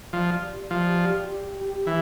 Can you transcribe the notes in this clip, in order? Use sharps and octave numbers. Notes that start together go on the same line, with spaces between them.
F3 D5
G4
F3 D5
G4
G4
G4
E3